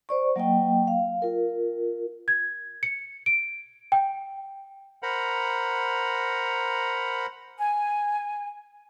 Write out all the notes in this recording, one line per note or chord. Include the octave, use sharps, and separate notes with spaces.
C5 D5 C#6
F#3 A#3 D#5 G5
F5
F4 A#4
G#6
C#7
D7
G5
A#4 C5 F#5 A#5 B5
G#5